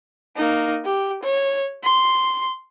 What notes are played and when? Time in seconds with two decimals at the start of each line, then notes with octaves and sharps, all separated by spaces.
0.36 A#3 D#4
0.85 G4
1.23 C#5
1.83 C6